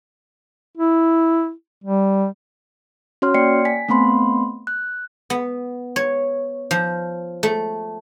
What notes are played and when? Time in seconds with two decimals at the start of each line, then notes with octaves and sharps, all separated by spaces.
0.77 E4
1.84 G3
3.22 C#4 F#4 C#5 C6 F6
3.34 A#3 D5 G5 C7 C#7
3.65 G#5 B6
3.88 A3 B3 C4 B5 C6
4.67 F#6
5.30 B3
5.96 C#5
6.71 F3
7.43 A3